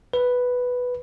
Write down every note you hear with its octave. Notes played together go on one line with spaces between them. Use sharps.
B4